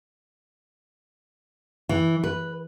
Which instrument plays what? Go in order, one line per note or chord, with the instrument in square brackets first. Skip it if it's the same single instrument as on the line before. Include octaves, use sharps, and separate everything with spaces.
[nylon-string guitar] E3
B4